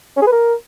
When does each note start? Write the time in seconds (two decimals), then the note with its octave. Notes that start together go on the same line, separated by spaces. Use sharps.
0.17 C#4
0.22 G#4
0.27 B4
0.32 A#4